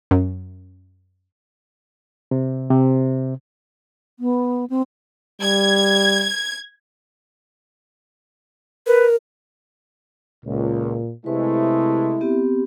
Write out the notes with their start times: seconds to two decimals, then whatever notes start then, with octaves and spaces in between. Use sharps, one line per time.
0.11 F#2
2.31 C3
2.70 C3
4.19 B3
4.70 C4
5.41 G3 G#6
8.87 A#4 B4
10.46 C#2 A#2
11.26 C3 G#3 A3 E4 B4
12.21 B3 C4 G4